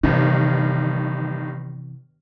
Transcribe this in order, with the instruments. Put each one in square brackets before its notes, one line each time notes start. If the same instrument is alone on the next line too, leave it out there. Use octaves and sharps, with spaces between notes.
[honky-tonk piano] G1 G2 D#3 [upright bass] C3 E3